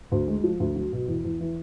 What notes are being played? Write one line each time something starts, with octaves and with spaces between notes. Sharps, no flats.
D2
G#3
F3
D2
F#3
B2
E2
E2
E3